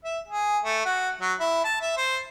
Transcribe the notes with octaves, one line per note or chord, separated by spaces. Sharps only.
E5
G#4
A3
F#4
F#3
E4
A5
E5
C5